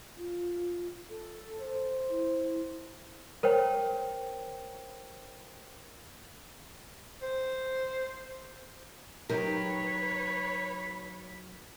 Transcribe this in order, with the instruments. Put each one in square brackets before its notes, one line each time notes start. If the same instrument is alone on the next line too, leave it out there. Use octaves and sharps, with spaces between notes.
[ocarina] F4
A4
[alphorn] C5
[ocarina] E4
[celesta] A#4 C5 C#5 G5
[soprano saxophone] C5
[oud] F#3 D#4 G4 [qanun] A#4 [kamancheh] B4 C#5 [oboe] B5